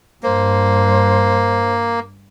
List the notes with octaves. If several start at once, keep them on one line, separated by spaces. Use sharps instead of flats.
G2 A#3 C5